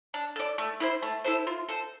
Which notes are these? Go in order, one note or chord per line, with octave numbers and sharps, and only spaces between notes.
D4
A4 D5
A3
E4 A4 C5
A3
E4 A4 C5
F4
A4 C5